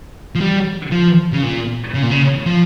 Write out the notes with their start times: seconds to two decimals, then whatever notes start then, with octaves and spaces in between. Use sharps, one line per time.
0.35 F3
0.41 G3
0.92 F3
1.33 C#3
1.43 A#2
1.94 C#3
2.02 A#2
2.11 C#3
2.46 F3